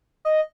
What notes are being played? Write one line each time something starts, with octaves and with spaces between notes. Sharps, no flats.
D#5